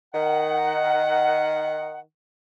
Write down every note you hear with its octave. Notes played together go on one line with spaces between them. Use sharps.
D#3 F#5